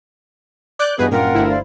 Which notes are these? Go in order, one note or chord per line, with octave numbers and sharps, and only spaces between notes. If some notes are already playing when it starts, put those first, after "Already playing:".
D5 D6 F#6 G6
E2 G2 F#4 G#4 B4 D#5 G6
F#1 G2 A#2 F4 A#4 F#5 G5
G1 D2 G2 E4
C5 D5 F5